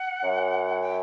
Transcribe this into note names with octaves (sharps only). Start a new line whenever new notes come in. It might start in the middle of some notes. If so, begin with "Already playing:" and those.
Already playing: F#5
F#2
G5